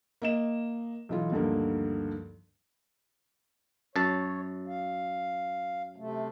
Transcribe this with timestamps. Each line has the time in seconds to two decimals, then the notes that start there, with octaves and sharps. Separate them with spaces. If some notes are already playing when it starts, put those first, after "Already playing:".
0.22 A#3 D#5 E7
1.09 B1 E3 F4
1.32 D2 G2 D#3 F3 A#3
3.96 F#2 C#5 A5
4.68 F5
5.96 C3 A3